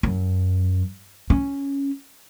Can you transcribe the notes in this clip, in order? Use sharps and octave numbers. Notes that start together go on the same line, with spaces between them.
F#2
C#4